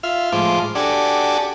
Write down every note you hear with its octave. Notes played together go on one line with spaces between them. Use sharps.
F4 E5 F6
A2 F3 G#3 F4 C5 D6
D4 F#4 G4 A4 D5 G#5